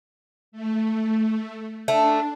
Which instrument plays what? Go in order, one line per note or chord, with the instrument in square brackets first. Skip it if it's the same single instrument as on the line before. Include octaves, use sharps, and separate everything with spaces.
[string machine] A3
[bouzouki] A3 [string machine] D4